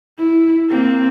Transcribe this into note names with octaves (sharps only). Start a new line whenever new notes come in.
E4
A#3 C4